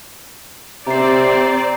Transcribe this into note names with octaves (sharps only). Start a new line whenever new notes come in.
C3 C4 C5 D5 A#5 C7